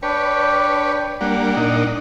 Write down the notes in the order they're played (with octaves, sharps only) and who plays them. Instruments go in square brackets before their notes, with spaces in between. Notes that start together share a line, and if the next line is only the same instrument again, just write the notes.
[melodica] D4 G5 [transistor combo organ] B4 C#5
[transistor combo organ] G3 A#3 D4 [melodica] F#5
[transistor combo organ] A#2 D4 D#4